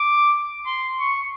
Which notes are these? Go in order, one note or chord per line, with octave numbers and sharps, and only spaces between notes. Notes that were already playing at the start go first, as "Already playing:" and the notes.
Already playing: D6
C6
C#6